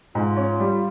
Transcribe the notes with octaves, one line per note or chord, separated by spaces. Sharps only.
G#2 F4
C#4
G3